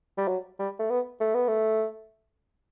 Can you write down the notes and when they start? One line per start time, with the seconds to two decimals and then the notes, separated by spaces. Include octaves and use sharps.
0.18 G3
0.28 F#3
0.59 G3
0.79 A3
0.90 B3
1.21 A3
1.34 B3
1.48 A3